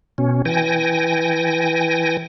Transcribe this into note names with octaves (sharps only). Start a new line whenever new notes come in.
B2 C#4
E3 G5 G#5 A#6